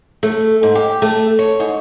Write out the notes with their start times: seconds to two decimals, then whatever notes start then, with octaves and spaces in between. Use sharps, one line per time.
0.23 A3
0.63 G#2
0.75 G4
1.02 A3
1.39 C#5
1.60 G#2